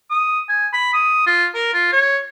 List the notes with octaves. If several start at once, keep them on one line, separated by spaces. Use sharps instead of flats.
D#6
G#5
B5
D#6
F4
A#4
F4
C#5